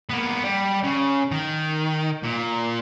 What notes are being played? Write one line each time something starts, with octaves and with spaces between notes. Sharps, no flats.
A#3 B3
G3
C#3
D#3
A#2